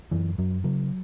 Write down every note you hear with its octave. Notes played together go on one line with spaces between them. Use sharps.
F#2 E3
F#2 F#3
C#3 F#3